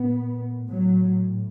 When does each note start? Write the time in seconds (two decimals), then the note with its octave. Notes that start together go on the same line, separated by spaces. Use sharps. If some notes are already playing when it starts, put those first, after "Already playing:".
Already playing: A#2 B3
0.69 A2 F#3